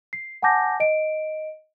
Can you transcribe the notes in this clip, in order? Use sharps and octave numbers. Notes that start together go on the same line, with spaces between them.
C7
F#5 G#5 A5 D6 G6 A#6
D#5 D7